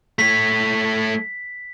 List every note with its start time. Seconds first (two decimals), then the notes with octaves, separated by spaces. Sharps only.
0.19 A3 C#5 B6